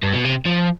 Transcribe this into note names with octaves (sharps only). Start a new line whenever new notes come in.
G2
B2
C3
F3